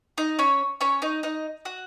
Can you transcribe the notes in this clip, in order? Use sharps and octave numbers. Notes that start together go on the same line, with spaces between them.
D#4 D#5
C#4 C#5
C#4 C#5
D#4 D#5
D#4 D#5
F#4 F#5